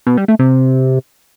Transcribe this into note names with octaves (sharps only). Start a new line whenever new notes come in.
B2
G3
A3
C3